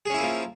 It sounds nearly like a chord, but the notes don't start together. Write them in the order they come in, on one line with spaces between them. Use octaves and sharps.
G#4 C#4 E4 A#3 F3